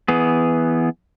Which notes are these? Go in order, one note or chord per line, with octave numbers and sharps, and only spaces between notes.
E3 B3 G#4